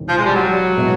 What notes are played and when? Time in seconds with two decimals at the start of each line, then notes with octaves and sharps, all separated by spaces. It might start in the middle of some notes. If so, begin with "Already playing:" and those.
Already playing: E1 E2 C3 D#3
0.09 F3
0.18 G#3
0.25 G3
0.35 F#3
0.77 B2 G#3 B3 E4